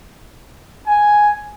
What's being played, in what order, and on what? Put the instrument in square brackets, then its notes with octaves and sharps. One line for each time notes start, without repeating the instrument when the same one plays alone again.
[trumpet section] G#5